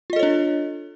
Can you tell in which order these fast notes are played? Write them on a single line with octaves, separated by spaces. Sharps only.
F4 D#5 A4 C#5 D4